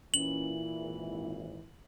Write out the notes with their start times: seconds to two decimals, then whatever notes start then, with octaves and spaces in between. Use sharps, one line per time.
0.14 A#2 E3 C#4 E4 F#7
0.79 G#1